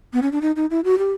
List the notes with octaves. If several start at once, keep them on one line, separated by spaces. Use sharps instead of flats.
B3
C#4
D4
D#4
D#4
E4
F#4
G4